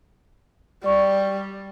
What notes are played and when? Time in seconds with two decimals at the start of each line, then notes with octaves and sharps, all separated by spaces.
0.84 G3 D5 C#6